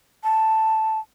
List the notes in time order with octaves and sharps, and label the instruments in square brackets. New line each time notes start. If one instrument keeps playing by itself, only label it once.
[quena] A5